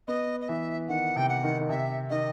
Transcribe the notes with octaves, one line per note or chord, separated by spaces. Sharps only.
B3 D#5
D#5
E3 E5
D#3 F#5
C3 G5
F#5
D#3
D#3
C3 E5
D#3 D#5